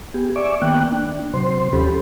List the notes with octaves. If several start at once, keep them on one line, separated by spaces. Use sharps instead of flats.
B3 G4 G#4
D5 E5 G#5 C#6 D6
D#3 A#3 B3 G5 F#6
D4
C3 F#3 C5 C6
D#2 F3 C#4 G4 A4 B5